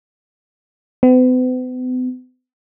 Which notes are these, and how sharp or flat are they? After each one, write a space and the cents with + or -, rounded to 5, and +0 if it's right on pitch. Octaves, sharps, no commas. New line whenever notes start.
B3 +45